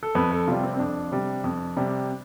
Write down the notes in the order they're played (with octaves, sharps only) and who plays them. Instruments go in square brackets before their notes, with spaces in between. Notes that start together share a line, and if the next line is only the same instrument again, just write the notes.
[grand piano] A4
F2 B4
A4
C3 G3 F4
C4
C4
F2 D4
C3 G3
F2
C3 G3